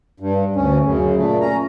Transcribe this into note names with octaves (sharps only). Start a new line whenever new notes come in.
G2
D2 C#4
F#2 C#3
A#2 A3
C#4 A#5